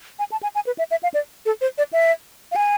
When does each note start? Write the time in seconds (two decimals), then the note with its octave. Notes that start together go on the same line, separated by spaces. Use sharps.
0.19 G#5
0.32 A5
0.43 G#5
0.55 G#5
0.67 B4
0.78 E5
0.91 E5
1.03 F5
1.14 D5
1.46 A4
1.61 C5
1.78 D5
1.93 E5
2.52 F5
2.56 G#5